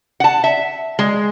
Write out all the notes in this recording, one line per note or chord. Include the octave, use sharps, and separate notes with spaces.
F#5 A5
E5
G#3